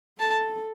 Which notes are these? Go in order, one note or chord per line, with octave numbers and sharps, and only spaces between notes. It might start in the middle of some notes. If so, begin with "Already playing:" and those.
A4 A5